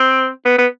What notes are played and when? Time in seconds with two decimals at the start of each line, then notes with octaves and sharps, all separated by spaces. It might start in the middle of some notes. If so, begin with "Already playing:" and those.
Already playing: C4
0.45 B3
0.58 B3